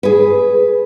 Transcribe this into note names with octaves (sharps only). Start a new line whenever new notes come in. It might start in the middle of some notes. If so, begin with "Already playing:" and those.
G#4 B4